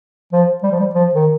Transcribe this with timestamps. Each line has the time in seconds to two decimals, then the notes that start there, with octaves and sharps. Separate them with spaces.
0.33 F3
0.63 G3
0.72 F3
0.80 G3
0.94 F3
1.15 D#3